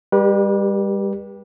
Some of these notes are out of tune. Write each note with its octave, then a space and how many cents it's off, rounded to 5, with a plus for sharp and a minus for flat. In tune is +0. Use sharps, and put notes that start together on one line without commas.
G3 +35 G4 +0 B4 -35